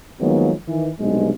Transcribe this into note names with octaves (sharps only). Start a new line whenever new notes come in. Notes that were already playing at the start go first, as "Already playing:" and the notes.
D#3 F3 F#3 G#3 A#3 B3
D#3 E3
B1 G2 C3 G#3